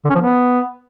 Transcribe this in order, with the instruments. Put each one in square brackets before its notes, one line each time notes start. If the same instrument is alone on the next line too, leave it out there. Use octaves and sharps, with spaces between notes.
[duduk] D3
C#4
F3
B3